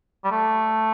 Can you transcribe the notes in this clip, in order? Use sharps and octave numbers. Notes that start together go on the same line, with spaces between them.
G3
A3